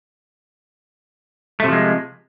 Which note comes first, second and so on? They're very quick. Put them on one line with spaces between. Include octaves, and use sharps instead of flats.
A3 C3 F3 G#3